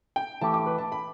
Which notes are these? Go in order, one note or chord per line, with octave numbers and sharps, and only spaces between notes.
G5
E3 A3 G4 A5
D6
B4
A5
B5